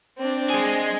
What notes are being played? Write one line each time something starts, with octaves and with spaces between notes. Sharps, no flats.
C4 D4
G#3 G#4